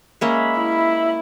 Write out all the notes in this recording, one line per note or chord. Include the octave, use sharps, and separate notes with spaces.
G#3 A#3 C#4 E5 B5
E4